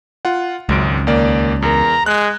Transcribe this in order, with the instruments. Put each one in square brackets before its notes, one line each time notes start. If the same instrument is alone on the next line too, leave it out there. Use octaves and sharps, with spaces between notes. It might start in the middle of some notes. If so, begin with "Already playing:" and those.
[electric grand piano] F4 F#5
[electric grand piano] G#1 F#2 D7 [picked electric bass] C#2
[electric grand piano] D#2 A#3 D5
[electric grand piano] E2 A#4 [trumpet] A#5
[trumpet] G#3 [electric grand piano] F#6